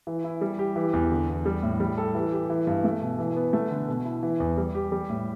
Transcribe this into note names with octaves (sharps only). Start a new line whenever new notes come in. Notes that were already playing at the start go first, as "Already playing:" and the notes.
E3
E4
G3
G4
E3
E2
D3
E2
G3
A2
G3
A4
E3
G4
E3
G2
A3
B2
E3
B3
A3
D3
B2
E4
E3
E2
G3
G4
G3
A2